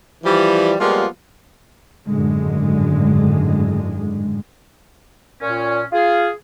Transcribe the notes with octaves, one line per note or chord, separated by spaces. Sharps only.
E3 F3 G3
F3 G3 G#3 A#3 B3 F4
G#1 F#2 A2 D3 G#3
A#2 C#4
F4 G#4 F5